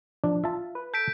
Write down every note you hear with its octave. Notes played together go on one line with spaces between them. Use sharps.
F3 D4
F4 E5 A5
B4
A4 G6 B6 D7